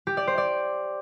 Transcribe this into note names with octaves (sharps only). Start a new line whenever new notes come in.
G4
D5
C5
D5